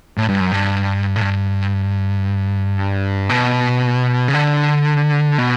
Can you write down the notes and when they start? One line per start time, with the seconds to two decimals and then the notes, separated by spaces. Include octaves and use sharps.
0.18 A2
0.29 G2
0.40 F#2
0.51 G2
1.16 A2
1.21 G2
3.29 B2
4.28 C#3
4.33 D3
5.38 B2